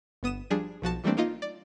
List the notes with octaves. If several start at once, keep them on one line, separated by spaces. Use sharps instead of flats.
G1 B3 D#6 D#7 E7
F3 G3 D4 G#4
B1 F3 F#4 A5
E3 G3 A3 A#3 C4 D4
A#3 D#4 F4 D#5
D5